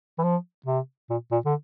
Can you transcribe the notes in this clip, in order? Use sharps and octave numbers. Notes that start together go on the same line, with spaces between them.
E3
F3
C3
A#2
A#2
D3